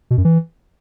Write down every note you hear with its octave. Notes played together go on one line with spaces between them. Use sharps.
B2
F#2
E3